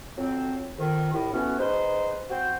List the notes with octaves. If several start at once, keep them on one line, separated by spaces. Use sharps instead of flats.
F2 F#3 C4
F2 D#3
C2 A2
E3 A3 B3 C#4 F#4
D#4 G#4 B4 C5
C4 F#4 C5